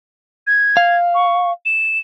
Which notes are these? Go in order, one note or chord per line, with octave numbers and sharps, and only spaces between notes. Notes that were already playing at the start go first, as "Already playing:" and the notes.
G#6
F5
C#6
E7